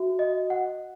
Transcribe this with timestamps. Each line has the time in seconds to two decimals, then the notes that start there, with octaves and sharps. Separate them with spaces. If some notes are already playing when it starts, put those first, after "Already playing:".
Already playing: F#4 E5
0.19 D#5
0.50 F#5